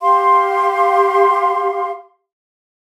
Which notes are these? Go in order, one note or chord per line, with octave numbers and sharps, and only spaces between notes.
G4 F5 C6